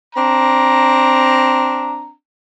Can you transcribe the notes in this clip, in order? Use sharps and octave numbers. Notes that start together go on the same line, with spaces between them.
C4 D4 A#5